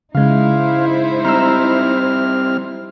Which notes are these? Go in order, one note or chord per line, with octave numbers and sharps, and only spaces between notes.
C#3 G#3 D#4 E4 C5 F5
G3 C4 A#5 C6 E6 F6